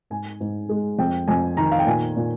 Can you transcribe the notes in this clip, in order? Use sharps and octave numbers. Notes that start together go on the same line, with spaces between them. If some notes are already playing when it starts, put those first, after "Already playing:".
G#2 G#5
G#2
G#3
F2 G5
F2 G#5
D#3 A#5
F5
G5
A#2 G#5
A#2